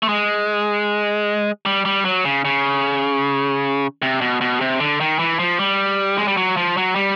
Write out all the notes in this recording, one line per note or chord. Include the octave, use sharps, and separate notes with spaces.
A3
G#3
G3
G3
F#3
C#3
C#3
C3
B2
B2
C3
D3
D#3
E3
F3
G3
G#3
G3
F#3
F3
F#3
G3